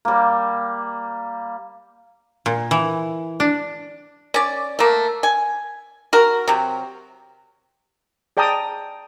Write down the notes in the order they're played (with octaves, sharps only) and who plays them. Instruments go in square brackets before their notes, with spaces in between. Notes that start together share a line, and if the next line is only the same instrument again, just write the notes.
[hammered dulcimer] G3 A#3
[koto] A#2
E3
D4
[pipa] C#4 D5
A3 A#3
G#5
F#4 A#4
C3 F#3
[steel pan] G#4 D5 G5 A5 A#5 D#6